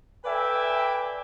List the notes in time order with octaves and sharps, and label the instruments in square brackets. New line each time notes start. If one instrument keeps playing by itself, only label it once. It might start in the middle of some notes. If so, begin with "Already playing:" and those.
[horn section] A4 B4 D5 E5 G5 G#5